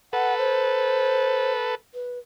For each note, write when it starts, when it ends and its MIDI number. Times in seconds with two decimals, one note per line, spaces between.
0.13 1.75 69
0.13 1.75 71
0.13 0.34 78
0.38 1.52 72
1.94 2.19 71